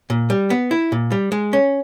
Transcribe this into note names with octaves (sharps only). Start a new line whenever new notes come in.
A#2
G3
B3
E4
A#2
G3
G#3
C#4